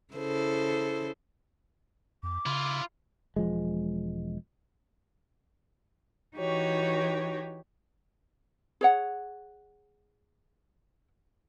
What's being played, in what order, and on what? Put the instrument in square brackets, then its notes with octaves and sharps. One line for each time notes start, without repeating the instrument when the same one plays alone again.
[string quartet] C#3 E4 A4 C5
[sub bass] F2 [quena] D6
[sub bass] C#3 [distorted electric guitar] E4 F4
[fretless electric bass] E1 F3 G#3
[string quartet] E3 D#4 F#4 G4 C#5
[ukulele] G#4 C#5 F#5